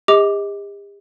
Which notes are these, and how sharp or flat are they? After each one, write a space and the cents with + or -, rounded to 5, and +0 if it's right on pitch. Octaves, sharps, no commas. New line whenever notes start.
G4 +45 D#5 +25 D6 +0